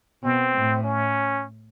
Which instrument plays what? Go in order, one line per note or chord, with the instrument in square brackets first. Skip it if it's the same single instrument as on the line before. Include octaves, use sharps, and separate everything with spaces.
[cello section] B2 [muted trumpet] C4
[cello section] A2
[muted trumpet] C#4